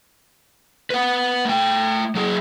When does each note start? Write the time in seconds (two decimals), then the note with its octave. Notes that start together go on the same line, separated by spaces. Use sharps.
0.90 B4 F#5
1.45 A3 G5
2.15 F#3 G#4